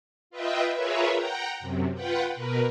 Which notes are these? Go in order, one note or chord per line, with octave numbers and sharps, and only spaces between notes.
F4 B4 D#5 E5 G5
F4 G#4 A#4 B4 C#5 E5
F#5 G5 A#5
F#2 C3
F4 B4 F#5 G5
B2 A#4 B4